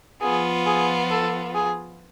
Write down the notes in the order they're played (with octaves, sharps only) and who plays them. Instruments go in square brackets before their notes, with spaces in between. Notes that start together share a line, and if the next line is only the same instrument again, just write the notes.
[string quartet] F3 B3 F4 [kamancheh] G#4
[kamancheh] G#4
A4
G#4